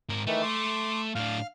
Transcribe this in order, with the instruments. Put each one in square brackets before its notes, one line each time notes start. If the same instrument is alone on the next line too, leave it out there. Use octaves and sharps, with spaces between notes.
[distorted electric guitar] G#2 A#4
[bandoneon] D#3 E3 [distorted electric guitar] A3
[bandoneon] C6 D6
[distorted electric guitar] A2 D4 [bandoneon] F5 F6